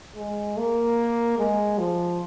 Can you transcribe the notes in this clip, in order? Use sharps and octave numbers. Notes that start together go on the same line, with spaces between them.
G#3
A#3
G#3
F3